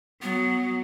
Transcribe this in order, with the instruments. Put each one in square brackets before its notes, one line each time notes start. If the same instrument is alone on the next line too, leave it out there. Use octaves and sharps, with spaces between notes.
[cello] F#3 [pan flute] B3